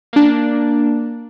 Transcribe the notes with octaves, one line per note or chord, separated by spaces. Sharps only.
A#3 D4